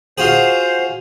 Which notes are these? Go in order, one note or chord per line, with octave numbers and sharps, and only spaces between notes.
F4 F#4 G#4 C5